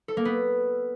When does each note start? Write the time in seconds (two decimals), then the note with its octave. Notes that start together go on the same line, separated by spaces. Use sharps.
0.08 A4
0.17 A#3
0.25 B3